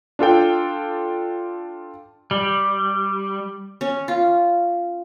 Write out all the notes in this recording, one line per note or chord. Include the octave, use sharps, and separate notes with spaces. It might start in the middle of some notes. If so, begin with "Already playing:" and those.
D4 F4 A4 G5
G3
C#4
F4